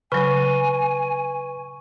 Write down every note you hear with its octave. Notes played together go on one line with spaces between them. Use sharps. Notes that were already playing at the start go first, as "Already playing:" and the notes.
C#3 F#3 B4 G#5 C#6